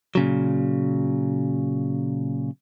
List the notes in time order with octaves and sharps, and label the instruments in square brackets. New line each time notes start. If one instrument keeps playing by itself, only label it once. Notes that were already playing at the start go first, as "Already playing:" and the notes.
[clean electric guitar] A#2 C#3 F#3